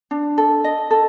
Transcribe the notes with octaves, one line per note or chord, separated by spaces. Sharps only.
D4
A4
D#5
A4